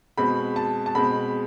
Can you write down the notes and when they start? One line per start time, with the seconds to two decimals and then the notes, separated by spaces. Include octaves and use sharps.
0.18 B2 G#3 C4 B5
0.56 A5
0.86 A5
0.95 B2 G#3 C4 B5